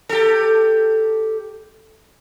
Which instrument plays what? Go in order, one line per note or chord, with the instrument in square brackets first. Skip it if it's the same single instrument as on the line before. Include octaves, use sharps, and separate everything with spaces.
[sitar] G4 A4